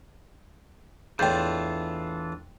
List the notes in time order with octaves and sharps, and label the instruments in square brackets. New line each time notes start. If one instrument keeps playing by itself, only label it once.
[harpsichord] E2 A2 [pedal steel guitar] E3 D4 F4 [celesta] G5 G6